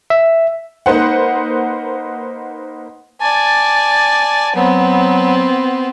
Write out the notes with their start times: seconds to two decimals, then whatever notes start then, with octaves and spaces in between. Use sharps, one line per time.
0.10 E5
0.86 A#3 D#4 B4 C5 F#5
3.21 D5 G#5 A5
4.56 F#3 B3 C4